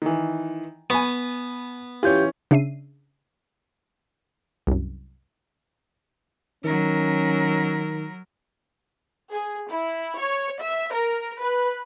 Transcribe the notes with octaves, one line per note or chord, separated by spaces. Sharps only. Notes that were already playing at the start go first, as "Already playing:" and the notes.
D#3 E3
B3 G#5 B5 C#6
E3 C#4 F4 G4 G6
C#3 D4 E5 C7 D#7
C2 F#2
D#3 F#3 C#4 A#4
G#4
E4
C#5
E5
A#4
B4